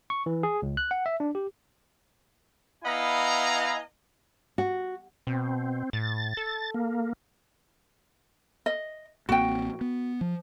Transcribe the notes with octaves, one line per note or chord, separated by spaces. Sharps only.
C#6
E3
G#4
C#2
F#6
F#5
E5
D4
G4
B3 E4 D#5 F5 G#5 A#5
F#4
B2 C4
A2 A6
A4
A#3
D#5
A1 A#3 C4 F#4 G5
B3
F3